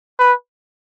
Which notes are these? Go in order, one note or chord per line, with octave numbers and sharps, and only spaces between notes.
B4